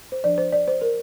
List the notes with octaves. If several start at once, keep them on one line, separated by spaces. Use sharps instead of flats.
C5
F3 D4 D5
C5
D5
C5
A#4